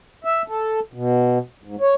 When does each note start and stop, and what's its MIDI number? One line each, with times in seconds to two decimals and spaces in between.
0.25 0.42 76
0.48 0.80 69
0.94 1.38 47
1.64 1.76 44
1.81 1.94 73